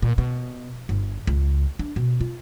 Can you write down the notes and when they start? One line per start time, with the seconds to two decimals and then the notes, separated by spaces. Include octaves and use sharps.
0.02 A#2
0.18 B2
0.89 G1
1.27 C#2
1.79 D4
1.96 B2
2.21 F4